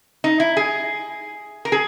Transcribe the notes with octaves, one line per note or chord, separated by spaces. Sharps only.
D#4
E4
G#4
A#4
G#4